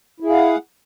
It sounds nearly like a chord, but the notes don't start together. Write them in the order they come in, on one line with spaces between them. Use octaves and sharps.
E4 G#4 F5 F#5